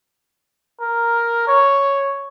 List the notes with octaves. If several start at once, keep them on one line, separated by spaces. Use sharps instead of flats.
A#4
C#5